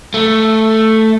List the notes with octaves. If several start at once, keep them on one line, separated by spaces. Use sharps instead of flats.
A3